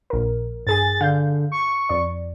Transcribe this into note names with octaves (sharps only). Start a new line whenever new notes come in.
A#1 A#4
G2 G#4 G#5 A6
D3 F5 G6
C#6
F2 D5